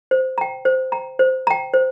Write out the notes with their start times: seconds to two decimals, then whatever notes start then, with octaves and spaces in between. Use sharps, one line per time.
0.11 C5
0.38 G5 A#5
0.65 C5
0.92 G5 A#5
1.19 C5
1.47 G5 A#5
1.74 C5